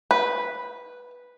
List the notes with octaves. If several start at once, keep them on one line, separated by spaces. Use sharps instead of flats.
B4